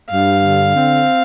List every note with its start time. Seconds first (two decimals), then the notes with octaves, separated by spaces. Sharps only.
0.10 G2 F5
0.43 D3
0.76 C4